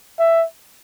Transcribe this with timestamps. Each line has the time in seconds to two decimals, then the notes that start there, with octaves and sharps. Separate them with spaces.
0.19 E5